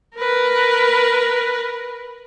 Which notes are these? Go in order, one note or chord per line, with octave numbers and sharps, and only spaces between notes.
A#4 B4